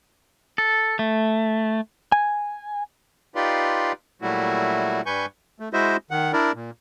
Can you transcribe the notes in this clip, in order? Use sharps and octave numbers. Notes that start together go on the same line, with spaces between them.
A4
A3
G#5
D#4 F4 G4 B4 D5 C6
A#2 F#3 G3 A3 E4 F#4
G2 G3 B4 G#5 C#6 G6
A3
G#3 E4 F#4 C5 D#5 E5
D#3 F#5
D4 E4 A#4 D5
A#2